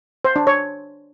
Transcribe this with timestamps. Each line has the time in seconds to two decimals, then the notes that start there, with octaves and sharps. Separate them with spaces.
0.25 C5
0.36 D4
0.47 C#5